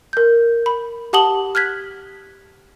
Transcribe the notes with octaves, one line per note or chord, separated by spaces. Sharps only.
A#4 G6
B5
G4 F#5 A5 D#6 F#7 G7
F6 F#6 G#6 B6